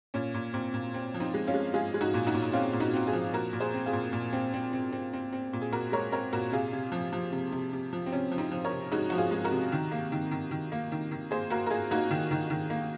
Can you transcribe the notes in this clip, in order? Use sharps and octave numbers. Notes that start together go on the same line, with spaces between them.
A#2 C#4
A#2
A#2 C4
A#2
C4
F3
C4 D#4
G#3
C#4 F4
G#3
G#3 F4 G#4
G#3
D#4 F#4
A#2
D#4 F#4
A#2
D#4
C4 C#4 F4
A#2
D#4 F#4
C4 F#4
F4 G#4
F3
A#2 F#4 A#4
A#2
G#4 C5
C4
F4 G#4
A#2
A#2
C4
C4
C4
C4
C4
C4
A#2
G#4
A#2 F#4 A#4
G#3 A#4 C#5
C4 A#4 C#5
A#2 F#4 A#4
C3 F4 G#4
C3
F3
F3
C3
C3
C3
F3
C4
C3 C#4
F3
C4 D#4
F3
A#4 C#5
C3
G#3 D#4 F#4
F3 F#4
F4 G#4
G#3
F#4 A#4
C3
D#3
A#3
D#3
D#3
D#3
A#3
D#3
D#3
A#3 G#4 C5
A#3 F#4 A#4
A#4
A#3 F4 G#4
A#3 D#4 F#4
D#3
D#3
D#3
A#3